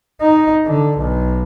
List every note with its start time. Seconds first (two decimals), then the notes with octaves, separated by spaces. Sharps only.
0.21 D#4
0.66 D3
0.98 B1